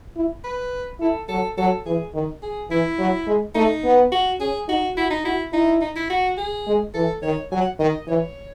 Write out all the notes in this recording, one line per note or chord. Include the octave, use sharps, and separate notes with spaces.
E4
B4
E4 A4
F#3 A4
F#3 A4
E3 G#4
D#3
G#4
E3 E4
F#3
G#3
A3 D#4
B3
F#4
C#4 G#4
D#4 F#4
E4 F#4
D#4
E4 F#4
D#4 E4
D#4
E4
F#4
G#4
G#3
E3 A4
D#3 C#5
F#3 G#5
F#5
D#3 D#5
E3 C#5